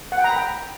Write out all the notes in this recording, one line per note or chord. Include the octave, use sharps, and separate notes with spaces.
F#5
G5
A#5
B5
G5